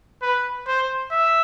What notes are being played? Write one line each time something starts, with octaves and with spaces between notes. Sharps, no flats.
B4
C5
E5